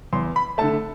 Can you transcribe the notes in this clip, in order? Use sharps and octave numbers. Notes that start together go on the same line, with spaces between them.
E2 C6
B5
D3 A3 A5